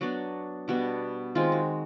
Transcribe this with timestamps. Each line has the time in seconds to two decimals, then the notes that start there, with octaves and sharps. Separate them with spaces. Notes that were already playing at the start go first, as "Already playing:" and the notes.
0.01 F#3 B3 D4 F#4
0.68 B2 G3 B3 D4 F#4
1.35 D#3 G#3 C4 F4
1.52 F#4